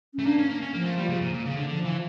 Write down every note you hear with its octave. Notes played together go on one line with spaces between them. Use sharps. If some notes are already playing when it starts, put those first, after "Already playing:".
A3 C#4
A#3 D4
C#4
A#3
C#4
F3 A#3
A3
G3
C#3
A#2
A#2
C#3
D3
D3 F3
E3